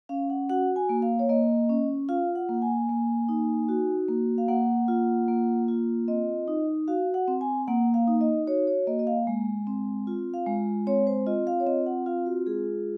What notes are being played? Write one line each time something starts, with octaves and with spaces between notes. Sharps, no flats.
C#4 F5
F#5
F#4 F#5
G#5
A#3
F5
C#5
A#3 D#5
C#4
F4 F5
F#5
A#3
F#5
G#5
A#3
D#4
F#4
A#3
F5
A#3 F#5
F4
A#3
F4
C4 D#5
D#4
F#4 F5
F#5
C4
G#5
A#3 F#5
F5
D#4
D#5
F#4 C#5
C#5
A#3 D#5
D#5
F5
G#3
C4
F4
F5
G#3
C4 C#5
C5
F4 D#5
F5
C#5
C4 D#5
F#5
F4 F5
F#4
G#3 G#4